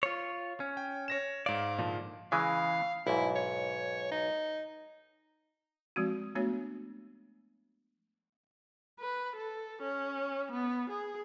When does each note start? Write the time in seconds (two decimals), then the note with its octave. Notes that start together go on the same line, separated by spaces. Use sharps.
0.03 F4 C#5
0.60 C#4
0.77 G5
1.08 C#5 A#6 E7
1.46 G#2 D5 F5
1.79 A#2 D3 F3
2.32 C#3 E3 G#3 F5
3.07 B1 G#2 E4
3.36 C#5
4.12 D#4
5.96 F3 G#3 C4 F#4
6.35 A3 B3 D4 F#4 C#5
9.00 B4
9.36 A4
9.82 C#4
10.52 B3
10.90 G#4